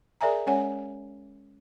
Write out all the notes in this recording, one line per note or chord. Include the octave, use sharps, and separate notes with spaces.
G#4 A#4 D5 E5 G#5 A#5
G#3 C#4 C#5 F#5 G#5